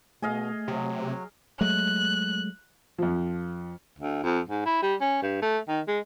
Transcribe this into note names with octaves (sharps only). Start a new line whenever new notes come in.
B2 A3 G#4 D#5 F5
C3 F#3
F#3 G#3 A3 F#6
F2 F3
D2
F2
G#2
E4
G3
C#4
G2
A3
D#3
G#3